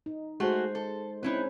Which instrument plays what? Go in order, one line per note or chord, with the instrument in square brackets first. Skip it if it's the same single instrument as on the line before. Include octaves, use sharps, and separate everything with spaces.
[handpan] D#4
[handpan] G#3 C5 [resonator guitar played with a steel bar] A3 F#4 G#4
[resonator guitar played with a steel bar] A4
[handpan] C4 C#4 [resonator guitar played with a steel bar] D#4 E4 B4